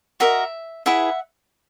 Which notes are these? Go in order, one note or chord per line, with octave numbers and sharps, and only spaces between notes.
F#4 A#4 D#5 E5
E4 G#4 B4 E5 F#5